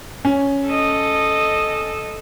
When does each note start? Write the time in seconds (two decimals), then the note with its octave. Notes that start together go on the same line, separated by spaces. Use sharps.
0.25 C#4
0.67 A4 D#5